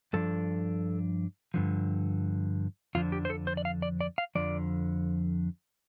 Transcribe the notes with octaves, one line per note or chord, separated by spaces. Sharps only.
G2 F3 D4 A4
G2 D3 F3
F2 D3 F3 D4 F4
G4
C5
A4
C5
D5
F5
D5
D5
F5
F2 D3 F3 D5